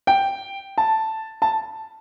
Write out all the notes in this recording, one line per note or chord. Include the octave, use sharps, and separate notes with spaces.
G5
A5
A5